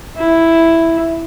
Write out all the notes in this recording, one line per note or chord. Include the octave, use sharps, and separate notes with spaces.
E4